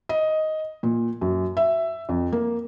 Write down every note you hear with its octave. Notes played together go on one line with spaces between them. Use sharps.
D#5
A#2
F#2
E5
F2
A#3